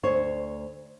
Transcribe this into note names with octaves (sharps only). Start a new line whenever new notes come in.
D2 C5 C#5